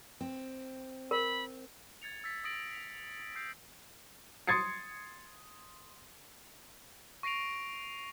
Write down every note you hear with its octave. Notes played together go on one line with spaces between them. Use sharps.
C4
A#4 B5
G#6 A6 C#7 F7
E6 A6 B6
D#6 A6 A#6 D7 F#7
B6
E6 G6 C7
C6 D#6 G#6 A6 C7 C#7
C#6 A#6 C7 D7 F7